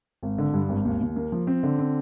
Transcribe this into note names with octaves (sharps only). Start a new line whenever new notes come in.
G#1
D3
G2
G#1
D#2
D#2
A#3
F3
C4
D3
C4